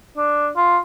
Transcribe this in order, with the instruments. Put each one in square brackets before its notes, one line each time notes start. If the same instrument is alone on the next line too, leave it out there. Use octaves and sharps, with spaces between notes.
[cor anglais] D4
F4